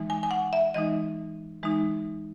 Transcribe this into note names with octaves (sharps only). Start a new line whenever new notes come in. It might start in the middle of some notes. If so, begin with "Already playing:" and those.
Already playing: E3 G#3 D#4
G#5
G#5
F#5
E5
E3 G#3 D#4 D#5
E3 G#3 D#4